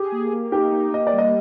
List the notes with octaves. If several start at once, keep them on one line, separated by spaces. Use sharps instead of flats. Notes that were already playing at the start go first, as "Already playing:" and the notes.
Already playing: G4 G#4
A#3
A#3
D#4 G4
A#3
A#3 D#5
D5
G3
D#5